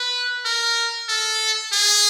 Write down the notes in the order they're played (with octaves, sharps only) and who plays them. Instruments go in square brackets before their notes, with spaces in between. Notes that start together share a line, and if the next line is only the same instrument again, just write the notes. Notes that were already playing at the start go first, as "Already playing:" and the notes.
Already playing: [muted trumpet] B4
A#4
A4
G#4